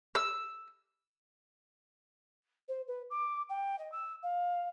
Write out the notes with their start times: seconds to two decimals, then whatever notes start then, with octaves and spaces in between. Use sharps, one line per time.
0.15 E6
2.68 C5
2.87 B4
3.10 D6
3.49 G5
3.78 D#5
3.91 E6
4.22 F5